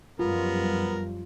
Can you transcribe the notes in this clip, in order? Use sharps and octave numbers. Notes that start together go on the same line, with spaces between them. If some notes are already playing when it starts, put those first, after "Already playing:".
F#2 F3 G3 B3 F4 A#4